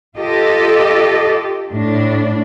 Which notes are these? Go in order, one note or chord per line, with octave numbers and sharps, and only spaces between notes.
F4 G4 A4 D#5
A2 D4